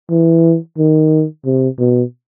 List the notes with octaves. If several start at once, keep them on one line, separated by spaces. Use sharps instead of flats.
E3
D#3
C3
B2